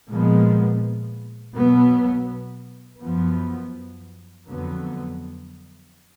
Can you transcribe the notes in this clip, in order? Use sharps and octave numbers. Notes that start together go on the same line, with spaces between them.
A#2 F3 G#3 B3
B2 F#3 B3
F#2 F3 B3
F2 D3 F#3 B3